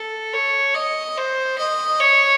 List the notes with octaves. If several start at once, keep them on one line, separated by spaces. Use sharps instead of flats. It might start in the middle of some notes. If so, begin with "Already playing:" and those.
Already playing: A4
C#5
D#5
C5
D#5
C#5